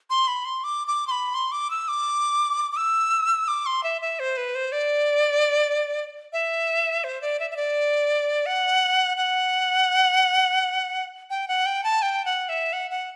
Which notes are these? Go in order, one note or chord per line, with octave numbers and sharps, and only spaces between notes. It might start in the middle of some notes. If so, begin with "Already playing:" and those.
C6
B5
C6
D6
D6
C6
B5
C6
D6
E6
D6
D6
E6
D6
C6
E5
E5
C5
B4
C5
D5
E5
C5
D5
E5
E5
D5
F#5
F#5
G5
F#5
G5
A5
G5
F#5
E5
F#5
F#5